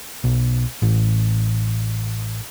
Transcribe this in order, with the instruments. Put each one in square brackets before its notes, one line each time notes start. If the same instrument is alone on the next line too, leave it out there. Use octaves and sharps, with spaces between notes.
[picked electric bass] B1
A1